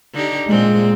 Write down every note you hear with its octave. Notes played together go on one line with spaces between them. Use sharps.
D3 D#4 G4
A#2 G#3 C4